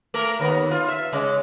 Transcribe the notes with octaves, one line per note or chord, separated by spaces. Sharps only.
A3 A#4
D#2 B3
F4
E5
C#3 G#3